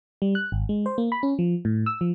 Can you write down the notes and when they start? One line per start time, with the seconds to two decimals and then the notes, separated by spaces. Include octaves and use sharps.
0.22 G3
0.35 F#6
0.52 G#1
0.69 G#3
0.86 C5
0.98 A#3
1.12 B5
1.23 C#4
1.39 F3
1.65 A2
1.86 E6
2.01 F3